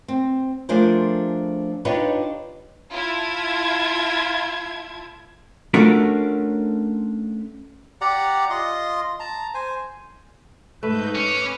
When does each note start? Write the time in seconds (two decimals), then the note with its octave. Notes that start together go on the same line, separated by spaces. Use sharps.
0.08 C4
0.69 F3 A3 D4 G#4 A#4 C5
1.85 D4 D#4 F4 G4 B4 C#5
2.92 E4 F4 A5 G#6
5.74 A3 C#4 D4 F4 F#4 A#4
8.01 G4 D5 F#5 A#5
8.50 F4 D#5 C6
9.20 A5 A#5
9.54 C5 G#5
10.83 G#2 A3 D#4 B4 G6
11.15 C#4 D6 E6 F6